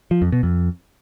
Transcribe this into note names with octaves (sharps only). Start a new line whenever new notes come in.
F3
F2
B2
F2